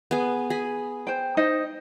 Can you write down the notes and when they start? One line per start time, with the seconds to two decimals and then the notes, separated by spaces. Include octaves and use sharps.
0.11 B3 G#4
0.50 G#4 B5
1.07 C5 G5
1.37 D#4 C5 D#5